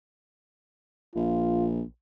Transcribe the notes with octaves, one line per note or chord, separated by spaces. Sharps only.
A#1 F4